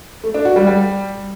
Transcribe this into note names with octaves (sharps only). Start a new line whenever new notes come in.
A3
D4
F#4
G3
G3